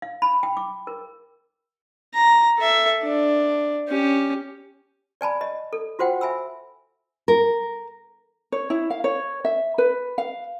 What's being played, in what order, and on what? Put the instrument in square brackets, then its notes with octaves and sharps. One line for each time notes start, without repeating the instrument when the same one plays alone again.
[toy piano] F5
B5
G5
D6
A#4
[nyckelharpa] A#5
A4 E5
D4
C#4 G4
[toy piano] D5 G#5 A5 B5
D#5
A4
F4 F#4 C5 F#5 G5
E5 G#5 B5 E6
[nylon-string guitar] A#4
[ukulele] C#5
E4
F5
C#5
E5
B4
F5